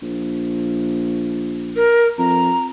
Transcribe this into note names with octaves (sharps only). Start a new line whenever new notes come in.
A#1
A#4
F2 A#5